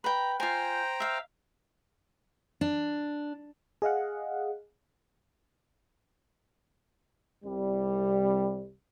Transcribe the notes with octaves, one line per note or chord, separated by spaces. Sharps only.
B4 G5 A#5
F4 C5 G5 G#5 A#5
E5 F5
D4
G#4 D#5 F5 F#5
C2 G3